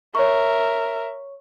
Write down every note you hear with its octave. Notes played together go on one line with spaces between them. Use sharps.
A#4 C#5 E5 C#6